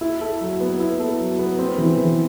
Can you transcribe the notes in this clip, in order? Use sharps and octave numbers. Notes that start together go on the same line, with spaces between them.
E4
A4
F#3
B3
E4
A4
F#3
B3
C4
E3
E3